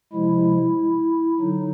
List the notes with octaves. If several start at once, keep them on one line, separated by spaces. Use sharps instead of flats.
C3 F3 G#3 E4
D3 F#3 D#4